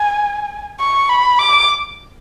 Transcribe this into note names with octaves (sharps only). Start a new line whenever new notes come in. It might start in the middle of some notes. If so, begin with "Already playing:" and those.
Already playing: G#5
C#6
B5
D6